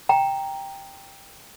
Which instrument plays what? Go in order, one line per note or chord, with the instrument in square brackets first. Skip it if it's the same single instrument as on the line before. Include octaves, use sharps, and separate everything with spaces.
[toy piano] G5 A#5